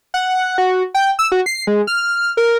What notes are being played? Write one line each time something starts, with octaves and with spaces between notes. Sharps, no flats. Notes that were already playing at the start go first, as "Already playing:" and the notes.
F#5
F#4
G5
E6
F#4
C7
G#3
F6
A#4